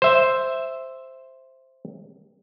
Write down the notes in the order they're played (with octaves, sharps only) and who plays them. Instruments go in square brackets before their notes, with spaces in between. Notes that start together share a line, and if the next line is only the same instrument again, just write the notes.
[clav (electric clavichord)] C5 E5